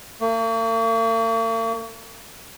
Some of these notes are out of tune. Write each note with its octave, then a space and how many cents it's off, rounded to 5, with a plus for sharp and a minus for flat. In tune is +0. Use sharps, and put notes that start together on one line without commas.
A#3 -45